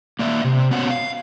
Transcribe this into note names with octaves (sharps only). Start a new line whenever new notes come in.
A#3 D5 E5
C3
B3 C#4 F#4 F#5
F5